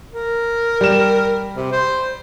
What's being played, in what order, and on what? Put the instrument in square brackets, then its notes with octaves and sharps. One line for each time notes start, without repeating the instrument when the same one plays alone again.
[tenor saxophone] A#4
[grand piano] G3 E7
[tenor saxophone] C3
C5